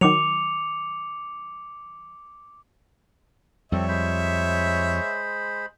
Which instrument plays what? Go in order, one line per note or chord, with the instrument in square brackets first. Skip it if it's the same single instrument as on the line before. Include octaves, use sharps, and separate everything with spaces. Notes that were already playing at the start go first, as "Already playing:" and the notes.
[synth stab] D#3 F#3 [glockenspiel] D6 C#7 F7
[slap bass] F2 G3 [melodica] C4 A4 [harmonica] C#5 E5
[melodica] G#3 C5 B5